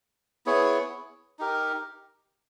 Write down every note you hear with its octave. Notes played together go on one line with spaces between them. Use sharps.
B3 E4 G#4 C#5
D#4 G4 A#4